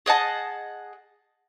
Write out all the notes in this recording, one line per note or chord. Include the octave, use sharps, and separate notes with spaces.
G#4 D#5 F#5 A5